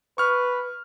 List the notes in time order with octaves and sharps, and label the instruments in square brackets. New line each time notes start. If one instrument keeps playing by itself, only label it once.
[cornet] B4 [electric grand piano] C#6 F6